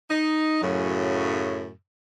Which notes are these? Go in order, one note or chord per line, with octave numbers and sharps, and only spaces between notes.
D#4
F#2 A2 C#3 F#3